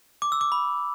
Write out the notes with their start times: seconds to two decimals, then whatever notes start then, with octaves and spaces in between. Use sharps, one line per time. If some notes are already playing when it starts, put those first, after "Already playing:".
0.22 D6
0.32 E6
0.41 D6
0.52 B5